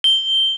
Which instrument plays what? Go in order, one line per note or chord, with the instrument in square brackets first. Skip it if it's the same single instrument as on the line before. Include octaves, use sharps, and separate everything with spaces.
[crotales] G7